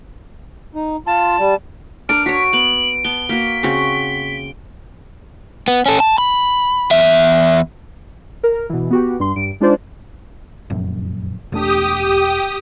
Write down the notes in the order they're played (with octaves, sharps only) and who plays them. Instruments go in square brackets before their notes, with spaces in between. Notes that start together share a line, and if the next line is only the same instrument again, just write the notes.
[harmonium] D#4
[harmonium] F4 [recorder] A5
[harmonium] G3
[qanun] D4 A#4 [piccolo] F6 [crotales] D7
[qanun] F#4 C#5 [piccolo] B6
[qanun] B3 [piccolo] F#7
[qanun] B3 [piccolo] A5 [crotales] G7
[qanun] A#3 F#4 [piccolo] B6
[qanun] C#3 C4 F#4
[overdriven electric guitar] B3
C#4 A4
A5
B5
E2 E5
[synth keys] A#4
B2 E3
B3 F#4 G4
G2 C6
G2 D7
G#3 D4 D#4 F4 C5 D5
[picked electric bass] F1 A#1 F#2
[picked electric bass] E1 A3 D4 [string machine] G4 D#6